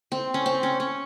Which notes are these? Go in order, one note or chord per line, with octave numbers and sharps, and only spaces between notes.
C4
C#4
C4
C#4
C#4